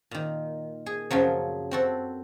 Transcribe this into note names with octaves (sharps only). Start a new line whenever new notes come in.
A#2 D#3
G#4
F#2 C#3 F3 F#3
C4 F#4 A4